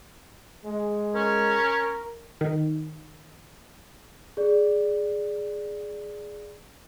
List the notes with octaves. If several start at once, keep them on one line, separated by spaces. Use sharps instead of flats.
G#3
C#4 A#4
D#3
G#4 D5